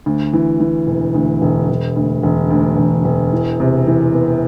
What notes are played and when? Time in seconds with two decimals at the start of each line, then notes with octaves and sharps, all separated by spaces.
0.06 D2
0.33 E3
0.60 E3
0.87 E1
1.15 D2
1.42 E1
1.69 E1
1.96 D2
2.23 E1
2.51 D2
2.78 E1
3.05 E1
3.33 E3
3.60 C3
3.87 E3
4.14 B3